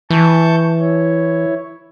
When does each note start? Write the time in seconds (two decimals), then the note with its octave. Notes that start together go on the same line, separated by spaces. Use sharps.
0.10 E3 A5 C#6 G6
0.79 E4 C#5